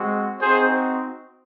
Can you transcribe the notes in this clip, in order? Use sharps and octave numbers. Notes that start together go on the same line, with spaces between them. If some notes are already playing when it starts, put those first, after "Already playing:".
Already playing: G#3 C4 F#4
C4 D#4 F#4 G#4 C5